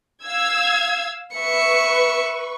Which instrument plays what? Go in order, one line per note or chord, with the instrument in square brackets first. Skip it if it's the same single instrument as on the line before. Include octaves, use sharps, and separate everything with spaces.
[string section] F5 E6 G#6
[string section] B4 C#6 [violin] E5 C#7